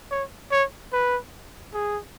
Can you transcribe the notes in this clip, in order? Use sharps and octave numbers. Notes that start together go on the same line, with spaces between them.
C#5
C#5
B4
G#4